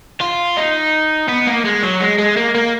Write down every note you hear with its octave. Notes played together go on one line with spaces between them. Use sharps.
F4
D#4
B3
A#3
G#3
F#3
G#3
G#3
A#3
A#3